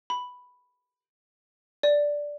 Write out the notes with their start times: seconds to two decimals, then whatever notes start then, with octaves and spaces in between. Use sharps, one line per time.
0.10 B5
1.83 D5